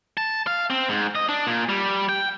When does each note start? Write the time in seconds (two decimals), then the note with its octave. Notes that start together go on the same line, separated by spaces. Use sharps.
0.17 A5
0.47 F5
0.70 C4
0.89 G#2
1.15 D#5
1.29 D4
1.47 A#2
1.69 G3
2.09 G5